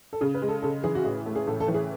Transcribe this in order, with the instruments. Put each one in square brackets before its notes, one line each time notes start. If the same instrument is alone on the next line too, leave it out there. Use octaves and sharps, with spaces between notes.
[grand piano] A4
[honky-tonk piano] C#3 [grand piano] G#4
[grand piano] B4
[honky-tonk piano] G#3
[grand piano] A4
[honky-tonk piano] C#3 [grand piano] A4
[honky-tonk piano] E3 [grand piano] G#4
[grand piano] F#4
[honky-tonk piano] A2 [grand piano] G#4
[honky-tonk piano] A3
[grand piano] G#4
[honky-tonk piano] A2 [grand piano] A4
[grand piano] A4
[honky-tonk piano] E3
[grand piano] G#4